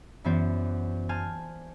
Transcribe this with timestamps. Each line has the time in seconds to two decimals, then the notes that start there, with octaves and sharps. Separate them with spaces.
0.24 F#2 E3 B3 F#4 C5 D5
1.09 C5 G#5 A5 F6